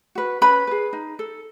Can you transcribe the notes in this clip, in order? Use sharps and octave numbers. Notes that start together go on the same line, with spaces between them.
F#4 B4
C#4 B4 B5
G#4 B4
D#4
A4